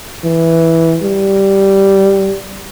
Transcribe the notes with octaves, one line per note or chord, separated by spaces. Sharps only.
E3
G3